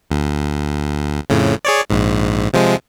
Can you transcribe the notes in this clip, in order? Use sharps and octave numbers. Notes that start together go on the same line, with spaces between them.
D2
F2 A2 C#3
G#4 C#5 D5
A#1 G#2
C3 F3 G#3